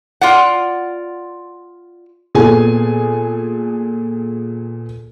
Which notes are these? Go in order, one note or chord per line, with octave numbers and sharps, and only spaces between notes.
F4 D5 F#5
A#2 B3 G#4 A4 G#5